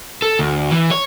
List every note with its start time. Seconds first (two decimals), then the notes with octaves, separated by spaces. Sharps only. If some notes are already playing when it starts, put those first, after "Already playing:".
0.22 A4
0.39 D2
0.71 E3
0.91 C#5